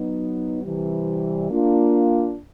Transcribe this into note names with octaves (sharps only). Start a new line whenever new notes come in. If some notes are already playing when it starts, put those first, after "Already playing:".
Already playing: F#3 B3 D#4
C3 E3 G3
A#3 D4 F4